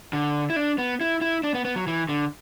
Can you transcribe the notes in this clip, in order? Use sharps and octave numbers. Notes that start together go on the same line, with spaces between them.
D3
E4
D4
B3
E4
E4
D4
B3
B3
F#3
E3
D3